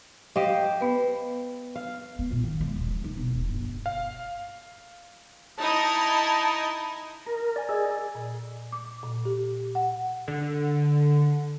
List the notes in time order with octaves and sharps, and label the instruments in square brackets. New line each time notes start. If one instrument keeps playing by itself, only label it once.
[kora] G4 C5 D#5 [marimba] F5
[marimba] B3 B4
[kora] F5
[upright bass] B3
A#2
D#3
G#3
D#1
F3
D#4
B1
D#1
G1
[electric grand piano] F5
[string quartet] D#4 E4 D#5 [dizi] A5
[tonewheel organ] A#4
[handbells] D5 G#5
[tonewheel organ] G#4 [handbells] D#5 E6
[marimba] A#2
D6
A#2
G4
F#5
[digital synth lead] D3